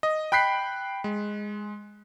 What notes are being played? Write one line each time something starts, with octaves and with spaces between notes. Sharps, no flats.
D#5
G5 B5 F#6 B6 C7
G#3